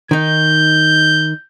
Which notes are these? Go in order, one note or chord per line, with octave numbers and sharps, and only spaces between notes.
D#3 D#4 G6